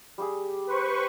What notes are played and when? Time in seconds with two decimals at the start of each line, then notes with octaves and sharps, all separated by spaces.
0.18 G3 G4 G#4
0.67 B4 C5 C#6